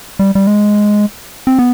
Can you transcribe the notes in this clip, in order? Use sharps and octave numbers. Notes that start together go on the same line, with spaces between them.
G3
G3
G#3
C4
B3